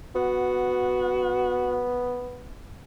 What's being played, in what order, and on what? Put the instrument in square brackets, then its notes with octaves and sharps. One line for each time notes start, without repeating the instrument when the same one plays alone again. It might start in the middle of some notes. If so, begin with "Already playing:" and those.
[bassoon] B3 [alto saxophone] F#4